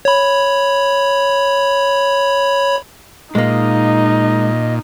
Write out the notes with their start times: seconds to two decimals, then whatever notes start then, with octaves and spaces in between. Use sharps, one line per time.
0.05 C#5 B5
3.35 A#2 G#3 A#3 D#4 D#5